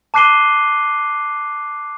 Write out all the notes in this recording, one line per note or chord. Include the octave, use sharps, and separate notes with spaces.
A5 D6 F#6 C7 D#7 G7